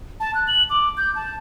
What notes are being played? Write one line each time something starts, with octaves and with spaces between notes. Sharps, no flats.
A5
F#6
F#7
D6
G6
A5